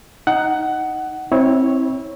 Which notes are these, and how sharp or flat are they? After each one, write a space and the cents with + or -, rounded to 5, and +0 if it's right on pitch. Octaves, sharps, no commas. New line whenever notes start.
D#4 +0 F#5 +15
C4 +15 E4 -30 C#5 +0